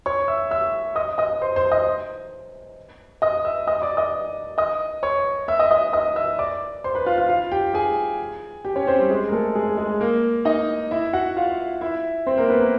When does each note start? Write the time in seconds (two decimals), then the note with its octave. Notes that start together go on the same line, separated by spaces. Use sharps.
0.06 C#5 C#6
0.28 E5 E6
0.51 E5 E6
0.96 D#5 D#6
1.18 D#5 D#6
1.42 C5 C6
1.56 C5 C6
1.71 D#5 D#6
3.22 D#5 D#6
3.45 E5 E6
3.67 D#5 D#6
3.82 D5 D6
3.97 D#5 D#6
4.58 D#5 D#6
5.03 C#5 C#6
5.48 E5 E6
5.59 D#5 D#6
5.71 D#5 D#6
5.93 D#5 D#6
6.16 E5 E6
6.39 D5 D6
6.84 C5 C6
6.95 B4 B5
7.06 F4 F5
7.18 F4 F5
7.29 F4 F5
7.52 G4 G5
7.74 G#4 G#5
8.65 G4 G5
8.76 C#4 C#5
8.87 C4 C5
8.98 G3 G4
9.10 G#3 G#4
9.28 A#4
9.32 A3 A4
9.55 G#3 G#4
9.77 G#3 G#4
10.00 A#3 A#4
10.45 D#4 D#5
10.91 E4 E5
11.13 F#4 F#5
11.37 F4 F5
11.81 E4 E5
12.27 C4 C5
12.38 A#3 A#4
12.49 B3 B4
12.60 A#3 A#4